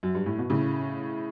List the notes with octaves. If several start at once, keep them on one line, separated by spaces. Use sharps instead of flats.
F#2
G2
A2
B2
A2 C#3